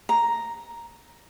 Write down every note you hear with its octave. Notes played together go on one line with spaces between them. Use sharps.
A#5